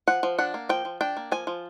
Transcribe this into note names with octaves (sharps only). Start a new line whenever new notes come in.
F3 F#5
F3
D4 F#5
A#3
F3 G5
F3
D4 G5
A#3
F3 G#5
F3